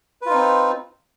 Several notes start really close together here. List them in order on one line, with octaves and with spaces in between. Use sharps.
B4 F4 D#4 C4